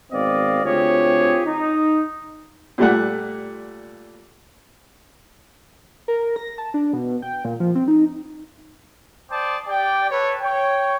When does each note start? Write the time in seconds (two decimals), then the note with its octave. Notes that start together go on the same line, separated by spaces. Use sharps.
0.12 G#1 B2 C4 D5 D#5 F5
0.63 D2 C4 F4 G4 G#4 C#5
1.45 D#4
2.78 A#2 G3 A3 F#5
6.08 A#4
6.36 A#6
6.58 A5
6.74 D4
6.93 B2
7.22 G5
7.45 A#2
7.60 F3
7.75 C4
7.88 D#4
9.31 C5 D5 G5 A5 D6 D#6
9.67 G4 D5 G5
10.10 A4 B4 C#5
10.42 C#5 G5